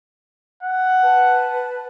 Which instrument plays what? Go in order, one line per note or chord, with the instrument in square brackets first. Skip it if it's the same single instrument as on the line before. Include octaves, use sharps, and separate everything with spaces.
[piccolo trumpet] F#5
[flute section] B4 A5